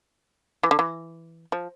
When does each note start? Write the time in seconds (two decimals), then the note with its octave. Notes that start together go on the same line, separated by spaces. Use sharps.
0.63 E3
0.71 D3
0.79 E3
1.52 F3